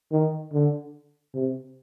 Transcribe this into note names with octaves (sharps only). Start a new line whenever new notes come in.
D#3
D3
C3